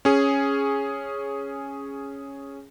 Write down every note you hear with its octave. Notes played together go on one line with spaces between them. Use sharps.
C#4 G#4